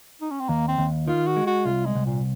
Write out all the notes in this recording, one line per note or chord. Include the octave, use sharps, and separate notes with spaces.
D#4
C#4
C4
D#2 A#3
C4
D#2
D#3 F4
F#4
G#3
F#4
C2 F4
G#3
C2
A#2